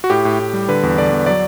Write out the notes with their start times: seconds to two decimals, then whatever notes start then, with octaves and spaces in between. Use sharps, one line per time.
0.04 F#4
0.10 A2 G4
0.25 A2
0.40 A2
0.53 G3
0.68 D3 B4
0.83 E2
0.98 D3 D5
1.12 E2
1.26 F#3 D5